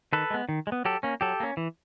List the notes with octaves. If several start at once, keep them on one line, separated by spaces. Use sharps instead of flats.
D#3 A4 B4
G#3 B3
D#3
G#3
B3
F#3 G4 A4
A#3 C#4
F#3 G4 A4
A#3 C#4
E3